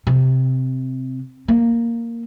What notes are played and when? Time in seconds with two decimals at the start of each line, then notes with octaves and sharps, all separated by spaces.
0.07 C3
1.48 A#3